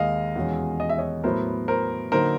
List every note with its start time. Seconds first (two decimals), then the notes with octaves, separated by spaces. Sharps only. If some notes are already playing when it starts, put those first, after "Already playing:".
Already playing: D#2 D#3 G#3 D#5 F5
0.36 E2 B2 G#3 C#4
0.80 D#5
0.89 E5
0.98 C#5 D#5
1.24 A2 F#3 B3 A#4 C5
1.68 A#4 C5
2.12 D3 F#3 A#3 D#4 A#4 C5